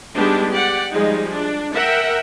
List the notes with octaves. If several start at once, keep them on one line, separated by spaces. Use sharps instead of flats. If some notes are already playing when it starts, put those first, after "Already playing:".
G3 G#3 B3 D4 D#4 G4
G4 D5 F#5
F3 G3 G#3 D#4
D4
A#4 E5 F#5 G5